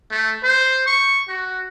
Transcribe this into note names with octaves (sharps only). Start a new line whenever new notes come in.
A3
C5
C#6
F#4